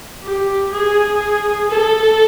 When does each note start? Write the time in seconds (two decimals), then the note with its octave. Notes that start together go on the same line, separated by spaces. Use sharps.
0.23 G4
0.72 G#4
1.70 A4